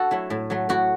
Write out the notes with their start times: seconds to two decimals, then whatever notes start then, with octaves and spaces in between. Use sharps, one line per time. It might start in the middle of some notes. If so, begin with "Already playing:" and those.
Already playing: D4 F#4 A4
0.11 F#3 A3 E4
0.30 A2
0.50 F#3 A3
0.69 A2 F#4